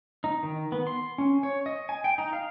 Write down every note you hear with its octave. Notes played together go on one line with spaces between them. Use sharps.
D#4
D#3
B3
C6
C#4
C#5
D#5
G#5
G5
D#4
F5